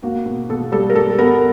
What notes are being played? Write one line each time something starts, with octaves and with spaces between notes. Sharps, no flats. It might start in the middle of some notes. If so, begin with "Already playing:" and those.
A#3 F#4
B2
B2 A4
G3 A4
A#4
G3 A4
B3 A#4